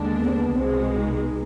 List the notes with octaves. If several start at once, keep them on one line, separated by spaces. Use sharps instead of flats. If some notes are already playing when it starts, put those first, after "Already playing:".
Already playing: D#2 D3 G#3 D4
B3
C4
B3
C2 B2 G#3 C4
D#4